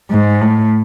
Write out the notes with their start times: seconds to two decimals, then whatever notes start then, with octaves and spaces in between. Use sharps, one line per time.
0.10 G#2
0.41 A2